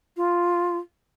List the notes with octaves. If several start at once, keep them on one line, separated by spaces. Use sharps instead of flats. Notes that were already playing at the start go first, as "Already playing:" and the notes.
F4